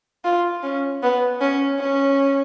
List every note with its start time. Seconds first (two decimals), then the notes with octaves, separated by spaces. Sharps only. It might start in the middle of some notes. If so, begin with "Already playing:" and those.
0.25 F4
0.63 C#4
1.03 B3
1.41 C#4
1.80 C#4